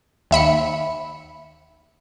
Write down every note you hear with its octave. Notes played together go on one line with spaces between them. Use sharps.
D#2 E5 B5 C#7